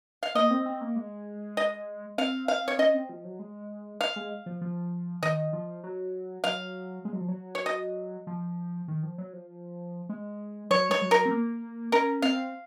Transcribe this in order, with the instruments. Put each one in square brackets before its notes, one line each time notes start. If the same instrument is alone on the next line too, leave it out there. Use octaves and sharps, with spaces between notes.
[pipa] F5
[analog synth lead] A#3 [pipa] D#5
[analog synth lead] C4
C4
A#3
G#3
[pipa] D#5
[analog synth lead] C4 [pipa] F5
[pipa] F5
C#5
[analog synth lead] C#4 [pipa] D#5
[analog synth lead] C4
F3
F#3
G#3
[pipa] F5
[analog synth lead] G#3
F3
F3
[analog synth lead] D#3 [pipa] D#5
[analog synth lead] F3
F#3
[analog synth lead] F#3 [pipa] F5
[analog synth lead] G#3
F#3
F3
F#3
[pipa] C#5
D#5
[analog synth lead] F3
D#3
F3
F#3
F3
G#3
[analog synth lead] F#3 [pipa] C#5
[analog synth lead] G#3 [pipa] C#5
[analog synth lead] F#3
[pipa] A#4
[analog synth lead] C4
A#3
[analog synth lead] C#4 [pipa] A#4
[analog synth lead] C4 [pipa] F5